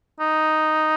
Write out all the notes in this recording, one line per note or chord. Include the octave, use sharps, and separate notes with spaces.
D#4